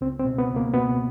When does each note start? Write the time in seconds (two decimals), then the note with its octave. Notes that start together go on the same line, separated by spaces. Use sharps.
0.01 C#2 C4
0.19 C4
0.25 B2
0.38 B3
0.50 C#2
0.56 A#3
0.74 B2 B3